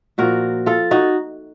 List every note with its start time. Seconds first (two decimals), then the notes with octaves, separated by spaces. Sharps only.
0.18 A#2 F3 F#4 A#4
0.66 F4 A4
0.91 D#4 F#4